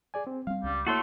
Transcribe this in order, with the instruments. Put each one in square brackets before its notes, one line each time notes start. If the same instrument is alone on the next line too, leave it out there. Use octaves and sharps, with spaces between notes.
[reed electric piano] G#4 D5 G#5
C4
[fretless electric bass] G3 C4 [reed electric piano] F5
[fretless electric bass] C#2 C#4 [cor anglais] G3
[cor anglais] A3 [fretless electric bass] A#3 [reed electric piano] E4 C#5 [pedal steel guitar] F#4 A4 C6